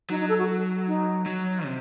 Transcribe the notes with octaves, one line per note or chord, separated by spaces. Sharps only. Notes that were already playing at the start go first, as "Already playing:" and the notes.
F#3 D#4
D#4
A4
F#4
D#4
F#3
C3